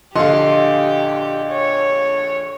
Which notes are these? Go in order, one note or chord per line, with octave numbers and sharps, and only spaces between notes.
A#1 D3 G4 D#5 F5 C6
C#5